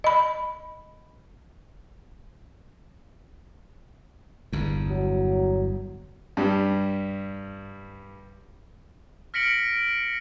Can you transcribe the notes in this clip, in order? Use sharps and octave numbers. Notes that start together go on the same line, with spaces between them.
D#5 B5
G1 E2
F#3
G2 G3
F6 A#6 B6 C#7 D7 F#7